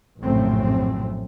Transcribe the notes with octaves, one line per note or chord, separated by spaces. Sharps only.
A#1 F#2 A2 C#3 A3 C4